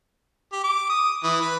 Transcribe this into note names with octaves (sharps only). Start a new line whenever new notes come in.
G4
D6
D#6
E3
B4